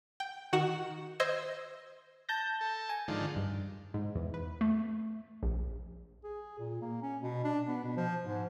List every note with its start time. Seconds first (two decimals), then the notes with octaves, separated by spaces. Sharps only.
0.20 G5
0.53 D#3 F#4 F#5 E7
1.20 C5 D#5 E6 G#6
2.29 A5 G6 A#6
2.61 A4
2.89 G#5
3.08 G#2 D3 D#3 F3
3.36 G2
3.94 G#2
4.15 E2
4.34 B4
4.61 A3
5.43 A#1
6.24 G#4
6.59 A#2
6.82 A#3
7.02 C#4
7.22 B2
7.44 D4
7.68 B3
7.84 B2
7.97 F3
8.25 G#2